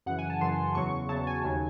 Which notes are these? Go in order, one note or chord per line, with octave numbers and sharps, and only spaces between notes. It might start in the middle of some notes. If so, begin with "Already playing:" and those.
F#2 C#3 E3 F#5
G#5
A5
F#2 C#3 E3 C6
E2 C#3 F#3 C#6
E2 C#3 F#3 A5
G#5
D#2 C#3 F#3